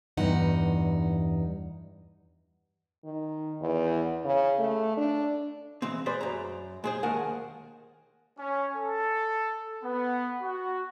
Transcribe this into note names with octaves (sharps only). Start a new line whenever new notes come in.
E2 G2 D#4 F#5
D#3
E2
C#3
A3
D4
E3 G#3 C4
G#4 B4 C5 D5
F#2 A#5
G#3 G#4 C5
D#2 A#4 F#5 G#5 A5
C#4
A4
B3
F#4